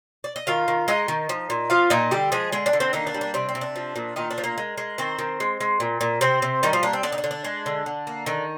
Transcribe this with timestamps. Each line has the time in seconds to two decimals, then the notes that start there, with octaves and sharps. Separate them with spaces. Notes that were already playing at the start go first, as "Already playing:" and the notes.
0.24 D5
0.36 D#5
0.47 D#3 F4 F5
0.68 D#3
0.88 G#3 D#4 D#5
1.08 D#3
1.29 F3
1.50 A#2
1.70 F3 F4 F5
1.90 A#2 D#4 D#5
2.11 D3 G3 G4
2.32 F3 G#3 G#4
2.52 D3 G#3 G#4
2.66 D4 D5
2.73 D3
2.80 C4 C5
2.93 D#3 A#3 D#4
3.07 D4
3.14 G3
3.21 D4
3.34 C3 D4
3.49 C4
3.55 C3
3.61 D4
3.76 F3
3.96 A#2
4.16 A#2 D#3 D#4
4.31 D4
4.38 F3
4.44 A#3 A#4
4.58 G#3
4.78 G#3
4.98 D#3 C4 C5
5.19 D#3
5.40 G#3
5.61 G#3
5.80 A#2
6.01 A#2
6.21 C3 C4 C5
6.42 C3
6.63 D#3 G3 D#4
6.73 F3 F4
6.83 A#3 D4
6.93 C4
7.03 D3 D4
7.12 D#4
7.18 D4
7.24 D3
7.31 D4
7.45 G#3
7.66 D3
7.86 D3
8.07 A#3
8.26 D3 D#3 D#4